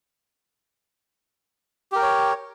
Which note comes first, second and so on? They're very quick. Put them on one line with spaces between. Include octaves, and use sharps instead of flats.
G4 A#4 G5 C#5